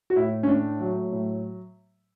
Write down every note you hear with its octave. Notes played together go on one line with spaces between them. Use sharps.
F#4
A2 E4
C#4
A3 D4
F#3
A2